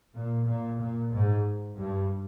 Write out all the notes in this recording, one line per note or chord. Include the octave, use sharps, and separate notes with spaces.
A#2
A#2
A#2
G#2
G2